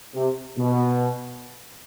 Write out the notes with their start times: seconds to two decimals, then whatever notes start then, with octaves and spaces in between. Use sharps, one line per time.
0.15 C3
0.58 B2